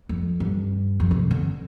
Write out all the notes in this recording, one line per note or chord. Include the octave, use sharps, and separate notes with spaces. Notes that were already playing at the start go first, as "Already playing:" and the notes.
F2
G2
F2
C3
D3